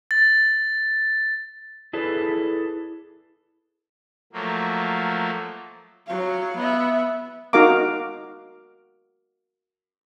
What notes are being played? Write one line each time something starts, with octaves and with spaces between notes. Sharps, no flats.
A6
E4 G#4 A4 B4 D5
F3 F#3 A3 A#3
F#3 F5
B3 E5
D#4 F#4 A#4 F5 A#5 D6